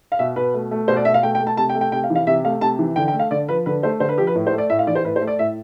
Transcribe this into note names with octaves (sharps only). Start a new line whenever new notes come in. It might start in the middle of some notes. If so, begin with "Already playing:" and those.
F5
B2 E5
B2 B4
A3
A3
B2 C5
D5
B2 E5
F5
A3 G5
G5
A3
A5
C3 A5
G5
A3
G5
C3 G5
F5
E3
F5
C3 E5
A3 F5
C3 A5
E3
D3 G5
G5
A3
F5
D3 D5
F3 B4
D3 B4
A3 C5
D3 C5
B4
F3 G4
B4
A2
C5
A3
D5
A2 E5
F5
E3 D5
C5
A2 B4
C5
A3
D5
A2 E5